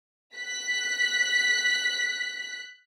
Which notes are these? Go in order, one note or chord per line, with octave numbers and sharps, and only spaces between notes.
F#6 B6